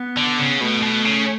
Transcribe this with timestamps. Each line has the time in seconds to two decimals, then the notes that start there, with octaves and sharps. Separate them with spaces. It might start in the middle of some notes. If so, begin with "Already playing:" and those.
Already playing: B3
0.17 D3
0.38 C#3
0.60 B2 A3
0.83 B2
1.05 C#3